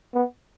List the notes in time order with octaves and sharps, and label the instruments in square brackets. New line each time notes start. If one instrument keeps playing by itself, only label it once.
[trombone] B3